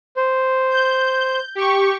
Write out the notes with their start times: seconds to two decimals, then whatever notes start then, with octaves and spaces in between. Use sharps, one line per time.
0.16 C5
0.71 G6
1.55 G4 C#6